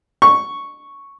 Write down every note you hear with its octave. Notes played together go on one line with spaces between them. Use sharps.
C#6